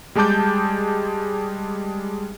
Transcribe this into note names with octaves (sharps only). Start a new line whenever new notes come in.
G3 G#3 G#4 A5 D6 G6